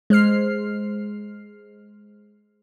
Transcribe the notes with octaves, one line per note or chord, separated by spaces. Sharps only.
G#3 C5 F6 C7